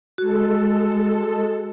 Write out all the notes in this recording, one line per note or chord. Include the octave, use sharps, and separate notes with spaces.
G#3 F#4 A4